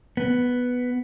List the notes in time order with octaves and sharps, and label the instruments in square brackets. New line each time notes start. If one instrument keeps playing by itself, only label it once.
[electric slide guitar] B3